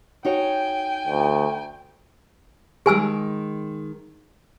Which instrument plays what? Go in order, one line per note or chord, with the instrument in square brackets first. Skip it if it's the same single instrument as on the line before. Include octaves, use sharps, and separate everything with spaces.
[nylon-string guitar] D#4 F#4 C#5 [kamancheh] G5 G#5
[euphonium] D2
[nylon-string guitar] D#3 G#3 [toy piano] G#4 G#5 E6